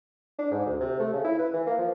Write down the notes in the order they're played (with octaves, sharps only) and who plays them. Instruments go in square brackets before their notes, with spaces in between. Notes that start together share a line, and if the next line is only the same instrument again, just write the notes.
[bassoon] D4
G#2
D2
C3
A3
C#3
E4
B4
E3
A#3
F3